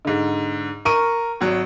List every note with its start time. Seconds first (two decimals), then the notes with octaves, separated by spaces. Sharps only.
0.05 G#2 D3
0.85 A#4 C#6 D#7
1.41 G#1 F#3